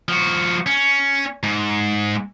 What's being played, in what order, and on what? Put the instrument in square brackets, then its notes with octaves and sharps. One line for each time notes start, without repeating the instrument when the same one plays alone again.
[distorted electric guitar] F3 F#4
C#4
G#2